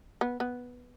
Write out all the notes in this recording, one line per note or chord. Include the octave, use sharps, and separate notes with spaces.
B3
B3